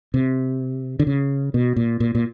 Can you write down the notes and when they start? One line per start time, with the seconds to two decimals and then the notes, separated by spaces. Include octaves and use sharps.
0.14 C3
0.99 D3
1.07 C#3
1.54 B2
1.76 A#2
2.00 A#2
2.15 A#2